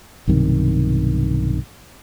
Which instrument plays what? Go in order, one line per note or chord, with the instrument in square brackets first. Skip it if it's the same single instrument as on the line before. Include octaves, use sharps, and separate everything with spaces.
[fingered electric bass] B1 G2 C3 D#3